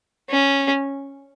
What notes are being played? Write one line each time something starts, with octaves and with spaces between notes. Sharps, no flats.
C#4